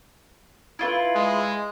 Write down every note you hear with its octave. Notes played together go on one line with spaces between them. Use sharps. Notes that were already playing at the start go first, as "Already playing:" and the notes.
E4 F4 B4
G#3